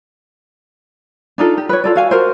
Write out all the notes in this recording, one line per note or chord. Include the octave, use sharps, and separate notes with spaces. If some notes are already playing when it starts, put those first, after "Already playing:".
D4 D#4 F4 A4
G4
B4 C#5
F4 A4 D5
F#4 F5 G#5
F#4 A#4 C5